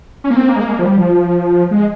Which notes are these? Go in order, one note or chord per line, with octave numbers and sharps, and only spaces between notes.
C#4
A#3
C4
A#3
G#3
A#3
G#3
A#3
F3
G3
F3
G#3